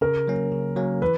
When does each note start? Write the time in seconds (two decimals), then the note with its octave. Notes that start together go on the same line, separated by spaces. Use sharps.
0.01 C#3 A#4
0.27 F#3 A#3 C#4
0.52 C#3
0.76 F#3 A#3 C#4
1.02 E3 B4